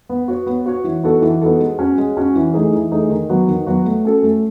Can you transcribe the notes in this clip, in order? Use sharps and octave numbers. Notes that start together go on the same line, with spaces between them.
B3
F#4 C#5
B3
F#4 C#5
E3
B3 D#4 F#4 A4
E3
B3 D#4 F#4 A4
G#3
C#4 F#4
G#3
C#4 F#4
E3
A3 D#4 G#4
E3
A3 D#4 G#4
D#3
F#3 B3 F#4
D#3
F#3 B3 F#4
A3
C#4 F#4 A4
A3